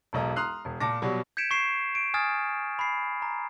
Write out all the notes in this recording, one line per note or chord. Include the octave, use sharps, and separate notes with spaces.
E1 B1 D#5 A#5
A#5 C6 D#6 F6 F#6 C7
E1
A#2 A5 D6 A#6
B2 F#3 G3
G6 G#6 B6 C#7 D7 E7
C#6 C7 E7
D7
G#5 D#6 F6 G#6 A6
B5 C7
A#5